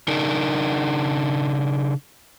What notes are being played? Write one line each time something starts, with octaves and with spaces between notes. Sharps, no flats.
C#3 D4 D#4 A#4